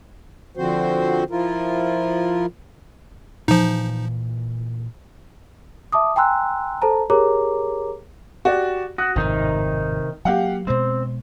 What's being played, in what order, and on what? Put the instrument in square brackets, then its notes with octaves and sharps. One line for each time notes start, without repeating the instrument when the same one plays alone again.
[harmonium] D3 F3 C4 F#4 C5
F3 E4 F4 A#4
[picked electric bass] A#2 E3 [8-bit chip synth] F3 D#4
[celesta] E5 A5 D6 D#6
G5 G#5 A#5 C6 E6 F#6
A4 C5 A5 A#5
G4 G#4 A#4 C#5 A#5 D6
[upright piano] F#4 G4 D5
[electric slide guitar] F#4 [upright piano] D#6
[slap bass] G#1 F2 A2 [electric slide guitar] C3 D#3 D#4
[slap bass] F#3 A#3 [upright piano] G4 F5 F#5
[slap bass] B2 G#3 [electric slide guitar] C4 [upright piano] C5